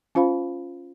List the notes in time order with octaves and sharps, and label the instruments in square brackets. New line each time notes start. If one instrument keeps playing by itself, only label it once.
[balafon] C#4 F4 C5 F5 B5